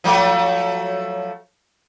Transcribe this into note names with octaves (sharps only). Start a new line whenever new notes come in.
F3 F#3 A3